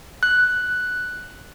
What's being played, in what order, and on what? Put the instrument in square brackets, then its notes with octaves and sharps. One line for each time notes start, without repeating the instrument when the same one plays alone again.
[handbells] F#6